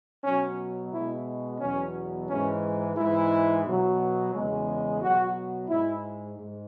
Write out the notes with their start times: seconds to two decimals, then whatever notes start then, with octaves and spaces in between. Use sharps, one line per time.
0.23 B2 F#3 C#4
0.92 B2 G#3 E4
1.60 E2 B2 F#3 C#4
2.28 G#2 E3 G#3 C#4
2.96 G#2 E3 G#3 E4
3.65 B2 F#3
4.33 E2 C#3 G#3
5.01 B2 F#3 F#4
5.69 G#2 G#3 E4
6.37 G#2